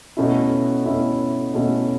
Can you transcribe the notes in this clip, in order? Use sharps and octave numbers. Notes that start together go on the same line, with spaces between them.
B2 A3 C#4 E4
B2 A3 C#4 E4
B2 A3 C#4 E4